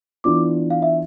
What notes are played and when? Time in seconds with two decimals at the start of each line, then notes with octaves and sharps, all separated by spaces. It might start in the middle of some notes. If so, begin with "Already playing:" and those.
0.24 E3 B3 D4 F4 D6
0.70 F5
0.82 E5